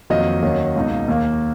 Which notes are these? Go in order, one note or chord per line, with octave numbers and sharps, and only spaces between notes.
F2 D#3 F#3 A#3 D#4 D#5
D#2 D#3 F#3 C#4
C#2 B2 A#3 D#4
D#2 D#3 A#3